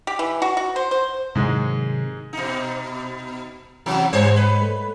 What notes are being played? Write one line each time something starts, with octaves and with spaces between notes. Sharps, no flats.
G4
E3
F#4
F#4
C5
C5
G#2 C3 D#3 F#3 G#3
B2 D#4
C3 E3 F#3
G#2 G3 C5 C#5
B4
A3